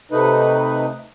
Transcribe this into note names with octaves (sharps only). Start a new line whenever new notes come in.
C3 A3 D#4 B4